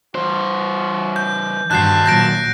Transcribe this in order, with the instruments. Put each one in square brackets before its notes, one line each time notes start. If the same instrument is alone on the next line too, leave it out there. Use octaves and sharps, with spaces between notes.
[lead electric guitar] E3 C5 [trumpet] F#4
[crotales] G6
[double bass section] G2 [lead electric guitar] D#3 F#4 [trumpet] A5 [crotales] F#6 G6 C7
[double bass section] A#2 F#3 [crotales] G6 A#6 D7